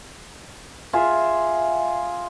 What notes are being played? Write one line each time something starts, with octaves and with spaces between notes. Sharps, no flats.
F4 G#4 E5